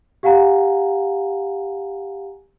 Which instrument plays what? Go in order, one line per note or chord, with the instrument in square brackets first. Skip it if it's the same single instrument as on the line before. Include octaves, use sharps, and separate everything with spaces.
[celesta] G4 F5 F#5 G#5 A#5